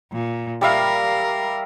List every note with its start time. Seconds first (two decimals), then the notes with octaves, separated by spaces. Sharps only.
0.12 A#2
0.61 G3 A#4 E5 F5